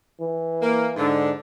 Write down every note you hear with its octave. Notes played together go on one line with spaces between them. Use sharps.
E3
A#3
G#2 D3